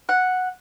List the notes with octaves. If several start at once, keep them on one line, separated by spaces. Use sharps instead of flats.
F#5